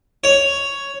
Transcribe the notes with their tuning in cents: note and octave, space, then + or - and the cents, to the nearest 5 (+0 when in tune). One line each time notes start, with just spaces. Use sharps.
C#5 +5